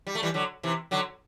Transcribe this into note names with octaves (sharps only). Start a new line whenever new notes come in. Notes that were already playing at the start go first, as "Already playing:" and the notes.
G3
A3
E3 G3
D3 F#3
C3 E3
D3 F#3